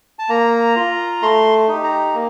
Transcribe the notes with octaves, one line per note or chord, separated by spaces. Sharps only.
A5
A#3 A#5
F4
A3 C6
D#4 G4
A#5
A#3